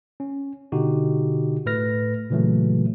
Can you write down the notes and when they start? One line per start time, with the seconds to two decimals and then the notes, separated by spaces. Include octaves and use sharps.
0.20 C#4
0.72 B2 D3 D#4 F#4 G4
1.66 A2 A3 B4 F6 A#6
2.30 A#2 C#3 E3 F#3 A3